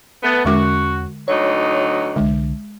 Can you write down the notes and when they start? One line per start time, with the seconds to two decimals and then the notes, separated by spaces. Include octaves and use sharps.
0.22 A3 B3
0.45 E2 D3 G#3 C#4 F#4 D6
1.28 D2 F#3 D#4 C#5
2.16 C2 D3 G#3